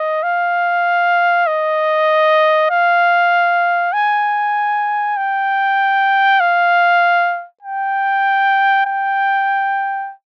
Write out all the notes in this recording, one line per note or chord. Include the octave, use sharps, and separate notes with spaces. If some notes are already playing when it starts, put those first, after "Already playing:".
Already playing: D#5
F5
D#5
F5
G#5
G5
F5
G5
G5